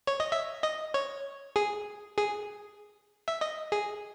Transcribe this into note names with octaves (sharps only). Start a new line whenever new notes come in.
C#5
D#5
E5
D#5
C#5
G#4
G#4
E5
D#5
G#4